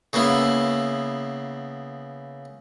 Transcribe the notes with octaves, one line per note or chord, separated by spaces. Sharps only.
C#3 A#3 B3 E4